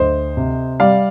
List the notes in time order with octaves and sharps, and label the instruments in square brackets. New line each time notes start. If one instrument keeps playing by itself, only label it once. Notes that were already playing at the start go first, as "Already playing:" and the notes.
Already playing: [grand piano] D2 C5 D#5
C3
G3 D5 F5